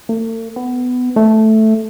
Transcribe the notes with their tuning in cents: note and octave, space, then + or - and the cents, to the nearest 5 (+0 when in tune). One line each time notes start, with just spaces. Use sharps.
A3 +45
B3 +15
A3 -5